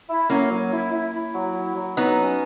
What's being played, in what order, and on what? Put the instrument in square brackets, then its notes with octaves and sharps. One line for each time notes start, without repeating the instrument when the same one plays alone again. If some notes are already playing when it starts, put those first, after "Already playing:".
[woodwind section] E4
[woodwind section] F#3 [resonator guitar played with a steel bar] A#3 C#4
[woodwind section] F#3
E4
E4
E4
F#3
E4
F#3
[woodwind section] F#3 [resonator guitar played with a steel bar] B3 D#4
[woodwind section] C#4